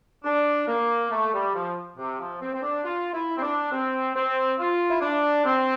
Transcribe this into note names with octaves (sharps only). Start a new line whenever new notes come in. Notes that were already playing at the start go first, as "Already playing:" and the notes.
D4
A#3
A3
G3
F3
C3
F3
C4
C4
D4
F4
E4
C4
D4
C4
C4
F4
E4
D4
C4